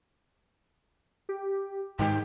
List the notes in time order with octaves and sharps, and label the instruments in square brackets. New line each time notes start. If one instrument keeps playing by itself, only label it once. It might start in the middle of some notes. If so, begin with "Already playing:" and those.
[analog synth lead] G4
[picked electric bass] G#2 D#3 [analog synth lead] G#3 [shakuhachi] G5